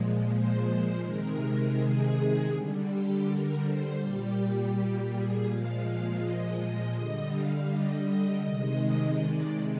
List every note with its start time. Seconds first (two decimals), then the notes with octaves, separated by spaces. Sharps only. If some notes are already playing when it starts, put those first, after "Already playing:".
Already playing: A#2 F3 G#3
0.25 C5
1.00 C3 D#3 G#3 A#4
1.74 G#4
2.48 D3 G3
2.85 G4
3.22 A#4
3.59 C5
3.97 A#2 G3 G4
5.08 G#4
5.45 A#2 F3 G#3 F5
6.19 D#5
6.56 D#5
6.93 D3 G3 D#5
7.30 F5
7.68 D#5
8.04 D#5
8.42 C3 D#3 G#3 D#5
9.15 D5